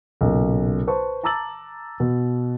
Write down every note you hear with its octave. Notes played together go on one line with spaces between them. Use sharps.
B1 A#2 C#3
B4 C5 A5 C#6
A5 A#5 D6 E6 A6 F#7
B2